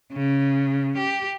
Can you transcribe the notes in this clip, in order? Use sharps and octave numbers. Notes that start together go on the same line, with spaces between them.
C#3
G4